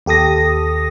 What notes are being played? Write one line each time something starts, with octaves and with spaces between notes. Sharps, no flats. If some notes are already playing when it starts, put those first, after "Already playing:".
D#2 G4 A4 D#6 A#6